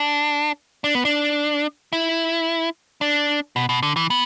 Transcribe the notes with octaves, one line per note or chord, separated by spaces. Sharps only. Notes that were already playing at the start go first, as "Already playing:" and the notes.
Already playing: D4
D4
B3
D4
E4
D4
B2
B2
D3
E3
B3